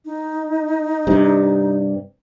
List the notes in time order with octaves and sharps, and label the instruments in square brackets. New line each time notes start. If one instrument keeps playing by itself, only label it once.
[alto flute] D#4
[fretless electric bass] G2 C3